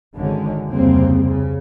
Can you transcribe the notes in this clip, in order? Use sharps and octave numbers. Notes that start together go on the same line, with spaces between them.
G#1 D3 D#3 G#3 C#4
F1 D2 C#3 G3 A#3 C4
C#3